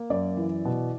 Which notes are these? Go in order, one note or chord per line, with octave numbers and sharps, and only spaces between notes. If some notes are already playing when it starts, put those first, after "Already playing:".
Already playing: A#3
F#2 D5
E3
B2